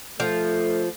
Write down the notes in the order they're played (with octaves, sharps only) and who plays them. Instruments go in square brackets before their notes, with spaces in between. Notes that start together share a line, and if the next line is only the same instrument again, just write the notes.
[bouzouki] F3 [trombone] A3